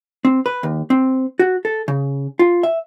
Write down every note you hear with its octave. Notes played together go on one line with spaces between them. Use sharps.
C4
B4
D#2
C4
F#4
A4
C#3
F4
E5